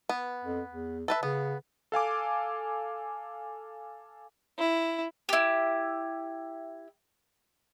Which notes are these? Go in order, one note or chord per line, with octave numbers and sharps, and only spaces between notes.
B3
F2
E2
A4 B4 E5
C#3 B3
A4 F5 G#5 D6
E4
E4 G4